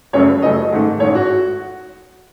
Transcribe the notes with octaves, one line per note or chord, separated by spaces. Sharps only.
F#1 F#2 C#3 F#3 A3 C#5
B4
F#1 F#2 C#3 F#3 A3 D#5
A1 G#2 D#3 A3
A1 G#2 D#3 A3 C#5
F#4